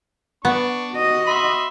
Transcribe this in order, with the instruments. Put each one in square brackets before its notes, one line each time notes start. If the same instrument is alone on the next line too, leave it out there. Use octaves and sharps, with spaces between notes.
[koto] B3 [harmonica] D4 C#6
[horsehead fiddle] F#4 D#5
[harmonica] E5 B5 C6